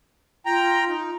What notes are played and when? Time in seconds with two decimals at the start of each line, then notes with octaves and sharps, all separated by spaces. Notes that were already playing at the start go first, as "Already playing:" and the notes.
0.46 F4 G5 A#5
0.88 D#4